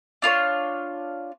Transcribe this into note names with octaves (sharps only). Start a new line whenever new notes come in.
D4 F4 B4 C#5